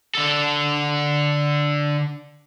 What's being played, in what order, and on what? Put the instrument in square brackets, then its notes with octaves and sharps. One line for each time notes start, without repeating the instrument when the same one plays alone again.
[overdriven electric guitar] D3 A4